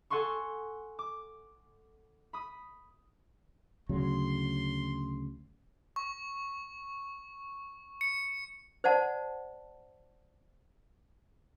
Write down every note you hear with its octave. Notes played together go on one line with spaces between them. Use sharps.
A4 F#5 G#5 C6 C#6
D6
B5 D#6
D2 C#3 F#3 C6
C#6
C#7
C5 D5 F#5 A5